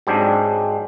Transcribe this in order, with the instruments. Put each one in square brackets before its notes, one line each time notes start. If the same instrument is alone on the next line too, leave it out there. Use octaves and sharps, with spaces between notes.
[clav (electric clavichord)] G#2 F#3 G#3 C4 D4 G4